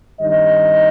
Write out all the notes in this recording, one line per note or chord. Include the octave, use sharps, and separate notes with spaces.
G2 D#3 C4 D#4 D#5